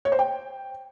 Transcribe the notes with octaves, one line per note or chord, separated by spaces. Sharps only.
C#5
C5
G5